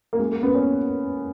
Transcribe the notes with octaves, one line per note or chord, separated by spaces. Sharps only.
A#3
G#3
A#3
B3
C#4